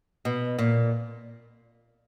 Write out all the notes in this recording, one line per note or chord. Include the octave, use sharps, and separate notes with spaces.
B2
A#2